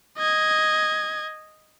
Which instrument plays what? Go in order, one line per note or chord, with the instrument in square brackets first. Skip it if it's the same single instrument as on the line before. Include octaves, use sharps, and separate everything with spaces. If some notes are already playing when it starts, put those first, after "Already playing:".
[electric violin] D#5 G#6